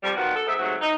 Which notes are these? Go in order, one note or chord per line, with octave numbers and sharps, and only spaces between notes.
F2 F3 G3
D#3 F3 B3 F#4
A4
G#2 D#4 E5
G#2 C3 F#3 A3 F#4
D#4